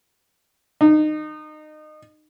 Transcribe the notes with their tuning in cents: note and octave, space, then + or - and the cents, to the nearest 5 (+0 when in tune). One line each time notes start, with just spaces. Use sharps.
D#4 -25